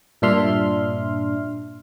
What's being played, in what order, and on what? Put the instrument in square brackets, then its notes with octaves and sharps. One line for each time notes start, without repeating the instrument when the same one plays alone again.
[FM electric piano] G2 A#2 D4 E5 C6 F6